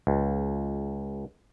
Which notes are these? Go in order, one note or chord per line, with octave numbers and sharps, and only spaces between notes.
C#2